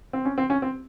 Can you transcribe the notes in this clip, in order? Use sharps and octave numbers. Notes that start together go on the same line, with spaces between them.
C4
C#4
C4
C#4
C4